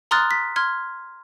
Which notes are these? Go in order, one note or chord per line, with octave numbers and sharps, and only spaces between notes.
A#5 C6 D#6 F6 F#6 A6
B6
C6 F6 G#6